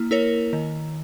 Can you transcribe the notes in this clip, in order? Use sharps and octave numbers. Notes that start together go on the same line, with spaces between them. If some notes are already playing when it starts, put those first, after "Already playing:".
Already playing: A#3 E4
E4 A#4 C#5
D#3